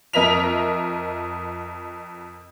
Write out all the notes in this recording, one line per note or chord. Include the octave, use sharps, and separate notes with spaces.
F2 A#4 D#5 E5 B6 F7